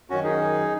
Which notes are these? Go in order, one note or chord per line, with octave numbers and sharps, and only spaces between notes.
F#2 D#3 C#4 F#4
D#4 G#4